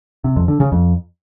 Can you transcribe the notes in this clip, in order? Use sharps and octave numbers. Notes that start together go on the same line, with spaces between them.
C3
F2
D3
C#3
F2